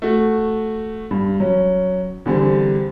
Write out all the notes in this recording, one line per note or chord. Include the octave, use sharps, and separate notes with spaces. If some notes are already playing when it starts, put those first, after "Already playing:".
A3 F#4
G2
F#3 C#4
E2 D3 G3 C4